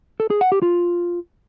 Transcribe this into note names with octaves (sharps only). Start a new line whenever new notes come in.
A4
G#4
F#5
G4
F4